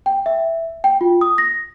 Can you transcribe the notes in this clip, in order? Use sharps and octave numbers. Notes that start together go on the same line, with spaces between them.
G5
E5
G5
F4
D#6
A#6